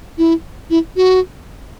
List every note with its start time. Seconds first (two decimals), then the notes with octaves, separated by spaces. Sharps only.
0.18 E4
0.70 E4
0.96 F#4